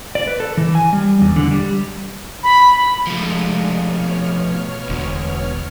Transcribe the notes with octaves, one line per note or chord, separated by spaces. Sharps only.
D5
B4
A4
E3
G#5
G3
E2
D3
G3
B5
F3 G#3 A3 D4
B2 C#5 F6
E1 D2